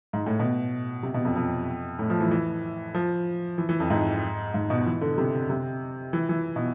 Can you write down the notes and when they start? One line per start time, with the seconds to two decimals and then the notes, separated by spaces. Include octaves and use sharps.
0.13 G#2
0.26 A2
0.39 B2
1.03 C3
1.14 B2
1.25 F2
1.36 F2
1.99 A2
2.10 F3
2.20 E3
2.31 E3
2.94 F3
3.58 E3
3.69 E3
3.80 F2
3.90 G#2
4.54 G#2
4.70 B2
4.86 E3
5.01 D3
5.18 C3
5.50 C3
6.13 E3
6.29 E3
6.56 B2